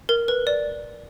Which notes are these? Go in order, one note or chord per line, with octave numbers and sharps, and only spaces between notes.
A#4
B4
D5